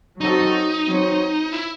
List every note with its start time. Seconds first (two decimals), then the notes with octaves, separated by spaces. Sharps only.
0.21 F#3 C4 D#4 F#4 A4 D#5
0.87 F#3 C4 F#4 C#5
1.53 E4